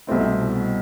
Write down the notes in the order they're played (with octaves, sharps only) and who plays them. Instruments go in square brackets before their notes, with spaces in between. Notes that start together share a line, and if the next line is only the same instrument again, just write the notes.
[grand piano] C2 B2 A3 C4 E4